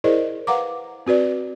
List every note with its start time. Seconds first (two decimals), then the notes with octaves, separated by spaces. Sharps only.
0.04 E4 G#4 A#4 C5 D5 D#5
0.47 B4 F5 F#5 A#5 D6
1.06 C4 F#4 B4 D5